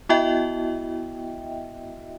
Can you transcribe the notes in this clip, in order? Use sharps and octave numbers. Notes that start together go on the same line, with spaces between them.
B3 E4 F#4 D#5 E5 G5